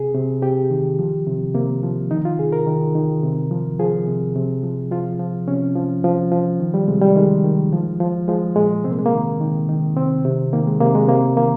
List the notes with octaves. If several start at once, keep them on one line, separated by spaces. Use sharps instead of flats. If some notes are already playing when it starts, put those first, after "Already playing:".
Already playing: C3 G#4
C3
C3 G4
D#3
F3
C3
C3 A#3
F3
D#3 D#4
F4
C3 G#4
A#4
D#3
D#3
C3
F3
F3 G#4
C3
C3
F3
F3 F4
F3
C3 C#4
F3
F3
F3
D#3
G3
C3 G#3
G3
D#3 G#3
D#3
F3
F3
F3 G#3
A#2 G#3
C3 C4
A#3
G#3
A#3
D#3
D#3
D#3
C3 C4
C3
D#3 A#3
G#3
C3 A#3
G#3
C3 A#3
D#3 A#3